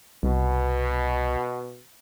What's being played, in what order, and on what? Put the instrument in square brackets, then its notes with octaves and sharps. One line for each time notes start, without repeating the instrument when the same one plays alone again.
[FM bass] C2 [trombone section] B2